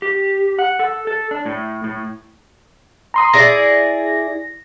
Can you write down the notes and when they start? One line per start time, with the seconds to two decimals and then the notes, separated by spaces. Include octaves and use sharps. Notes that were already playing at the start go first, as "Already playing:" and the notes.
0.02 G4
0.59 F#5
0.79 A4
1.07 A4
1.31 D4
1.46 A2
1.84 A2
3.14 A#5 C6 D#6
3.33 E4 G#4 D5 A#6